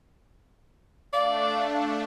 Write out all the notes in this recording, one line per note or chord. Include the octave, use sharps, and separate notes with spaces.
A3 D4 D5 F5